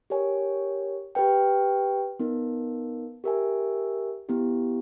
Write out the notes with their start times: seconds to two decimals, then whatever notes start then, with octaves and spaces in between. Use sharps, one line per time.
0.10 G4 A#4 C#5 G#5
1.15 G4 B4 G5
2.20 B3 D#4 A#4
3.24 G4 A#4 E5 G#5
4.29 B3 E4 G4